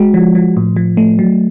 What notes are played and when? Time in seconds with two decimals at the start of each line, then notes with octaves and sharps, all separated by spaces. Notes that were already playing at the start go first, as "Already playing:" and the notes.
Already playing: G#3 F#4
0.14 F3
0.35 F3
0.57 A2
0.76 F3
0.97 A3
1.19 F#3